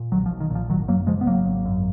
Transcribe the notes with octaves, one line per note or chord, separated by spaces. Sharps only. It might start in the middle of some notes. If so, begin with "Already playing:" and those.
Already playing: A#2
B1 D#3 F#3
F3
B1
D#3
A#2 F3
G#1 D#3 F#3
F#2 F#3 A#3
C#3 F3 G#3
B3
G#1 F#3 A#3
G#1
F#2